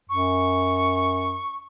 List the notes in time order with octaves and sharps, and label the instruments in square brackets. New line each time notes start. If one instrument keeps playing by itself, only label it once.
[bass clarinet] F#2 [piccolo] C#6